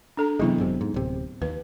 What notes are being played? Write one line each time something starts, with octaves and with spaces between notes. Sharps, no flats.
D4 A4 A#5
C3 E3 F#3 G#3 B3 E4
G#1 F#2 C3
G#2
D1 C3
D#2 B4